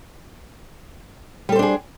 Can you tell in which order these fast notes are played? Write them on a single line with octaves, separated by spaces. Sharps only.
G3 A4 C5 D4 G#4